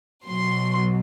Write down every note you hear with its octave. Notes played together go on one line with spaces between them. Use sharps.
B2 F#3 C6